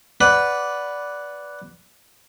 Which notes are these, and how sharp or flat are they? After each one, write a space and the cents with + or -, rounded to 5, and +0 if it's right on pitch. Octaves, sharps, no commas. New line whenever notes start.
B4 +0 D5 -10 F#5 +0